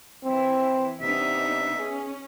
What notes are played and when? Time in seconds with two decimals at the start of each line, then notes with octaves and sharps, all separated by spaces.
0.24 E3 C4 E4
1.01 C3 B3 D4 D#4 E5
1.78 C#4 G#4